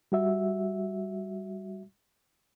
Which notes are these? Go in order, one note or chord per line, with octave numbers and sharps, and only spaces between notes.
G3 F#4 E5